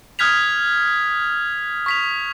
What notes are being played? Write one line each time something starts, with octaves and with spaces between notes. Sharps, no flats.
D#6 F6 F#6 G#6 B6 F7
C#6 B6 F7